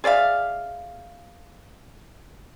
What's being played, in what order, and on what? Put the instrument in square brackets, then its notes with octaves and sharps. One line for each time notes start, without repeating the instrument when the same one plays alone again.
[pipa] G#4 D5 E5 F5